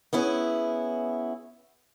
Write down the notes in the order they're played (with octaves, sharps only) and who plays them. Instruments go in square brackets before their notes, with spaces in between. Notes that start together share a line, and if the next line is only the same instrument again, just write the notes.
[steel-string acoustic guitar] B3 C#4 E4 G#4